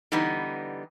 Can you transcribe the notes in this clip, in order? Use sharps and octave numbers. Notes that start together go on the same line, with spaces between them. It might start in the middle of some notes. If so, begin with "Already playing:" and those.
D3 E3 G3 B3 D#4